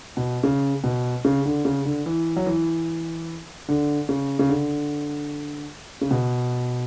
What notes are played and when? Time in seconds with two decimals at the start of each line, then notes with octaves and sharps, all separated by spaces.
0.17 B2
0.43 C#3
0.84 B2
1.25 C#3
1.46 D3
1.65 C#3
1.85 D3
2.06 E3
2.36 F#3
2.46 E3
3.69 D3
4.09 C#3
4.39 C#3
4.49 D3
6.01 C#3
6.11 B2